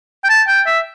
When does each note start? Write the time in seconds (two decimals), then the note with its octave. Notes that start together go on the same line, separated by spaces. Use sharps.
0.24 G5
0.30 A5
0.48 G5
0.67 E5